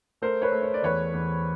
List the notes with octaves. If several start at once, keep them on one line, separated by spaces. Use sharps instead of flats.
A3 A#4 C5
B4 C#5
A3
C#5
D5
E2 B4 C#5
E2